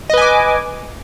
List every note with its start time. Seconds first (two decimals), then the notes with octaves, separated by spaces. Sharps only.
0.10 D#5
0.14 B4
0.17 G#5
0.21 D6